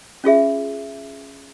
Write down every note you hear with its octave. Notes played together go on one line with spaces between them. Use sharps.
C#4 F4 G#4 E5